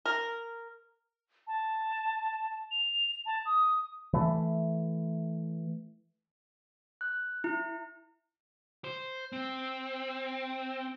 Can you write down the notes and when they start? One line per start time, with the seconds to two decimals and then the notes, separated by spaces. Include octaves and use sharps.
0.05 A#4
1.47 A5
2.71 F7
3.26 A5
3.46 D#6
4.13 E3 A3
7.01 F#6
7.44 E4
8.84 C5
9.32 C4